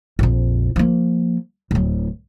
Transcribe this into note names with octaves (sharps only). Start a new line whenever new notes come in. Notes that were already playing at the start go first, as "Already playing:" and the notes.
A#1 F2
F3 A#3
D1 F#3